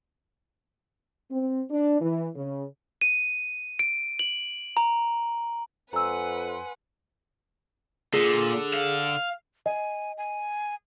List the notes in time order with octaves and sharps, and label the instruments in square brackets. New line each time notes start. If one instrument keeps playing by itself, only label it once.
[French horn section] C4
D4
E3
C#3
[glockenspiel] D#7
D7
F#7
A#5
[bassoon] F2 [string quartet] B4 F#5 [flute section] G#5 C6 [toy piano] A#5 E6
[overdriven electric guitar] A#2 [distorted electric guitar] D3 [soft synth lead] G#4
[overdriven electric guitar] F5
[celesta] D#5 [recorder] G#5
[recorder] G#5